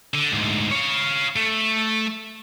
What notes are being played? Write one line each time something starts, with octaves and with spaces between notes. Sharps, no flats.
D3
D2 G#2
C#5 F5
A3